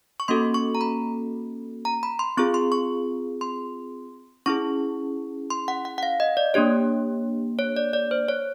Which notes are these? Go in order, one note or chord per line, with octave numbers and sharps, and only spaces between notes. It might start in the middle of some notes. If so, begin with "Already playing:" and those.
C#6
A#3 C#4 F#4 A4 C6
C#6
A#5
B5
A#5
B5
C6
C4 F4 G#4 C#6
C6
C#6
C6
C#4 E4 G#4 C#6
C6
F#5
F#5
F#5
F5
D#5
D5
A#3 D4 G4 C#5
C#5
D5
D5
C5
C#5